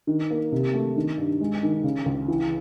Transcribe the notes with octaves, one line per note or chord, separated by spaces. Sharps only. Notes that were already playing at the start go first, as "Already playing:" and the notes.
D#3
A#3
C3
A3
D#3
G2
G#3
D#3
C#3
C#2
E3